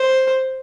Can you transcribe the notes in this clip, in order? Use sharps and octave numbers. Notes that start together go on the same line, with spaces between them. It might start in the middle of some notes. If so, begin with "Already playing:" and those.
Already playing: C5